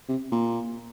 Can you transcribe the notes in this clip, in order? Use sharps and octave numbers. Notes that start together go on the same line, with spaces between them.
C3
A#2